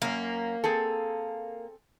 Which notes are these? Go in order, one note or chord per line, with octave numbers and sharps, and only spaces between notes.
F#2 A#3 C#4
C4 G#4 A4